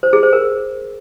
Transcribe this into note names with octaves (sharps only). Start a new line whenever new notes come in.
C5
G#4
C5
A#4